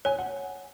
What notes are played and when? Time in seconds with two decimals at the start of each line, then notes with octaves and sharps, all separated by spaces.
0.05 C#5 G#5
0.19 F#5